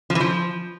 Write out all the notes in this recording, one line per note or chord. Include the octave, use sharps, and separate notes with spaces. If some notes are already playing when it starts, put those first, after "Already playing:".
F3
E3
F3